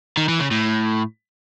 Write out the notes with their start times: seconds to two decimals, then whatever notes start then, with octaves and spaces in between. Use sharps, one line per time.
0.17 D#3
0.29 E3
0.40 C#3
0.51 A2